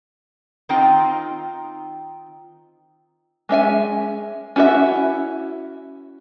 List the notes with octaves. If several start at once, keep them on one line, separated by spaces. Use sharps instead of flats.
D#3 C4 D#4 F4 G5 A#5
G#3 C#4 E5 G#5
C#4 E4 F#4 B4 E5